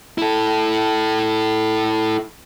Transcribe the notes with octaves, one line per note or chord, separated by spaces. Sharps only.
E4 A4